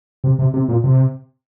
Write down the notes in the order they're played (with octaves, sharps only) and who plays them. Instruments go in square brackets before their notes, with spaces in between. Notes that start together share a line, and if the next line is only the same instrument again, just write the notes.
[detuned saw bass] C3
C3
C3
A#2
C3